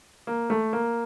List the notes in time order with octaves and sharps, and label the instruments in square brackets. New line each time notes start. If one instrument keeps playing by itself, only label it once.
[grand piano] A#3
A3
A#3